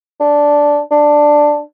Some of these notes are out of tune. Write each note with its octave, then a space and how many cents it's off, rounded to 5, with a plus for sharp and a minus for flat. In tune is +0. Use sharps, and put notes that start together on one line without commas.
D4 -5
D4 +5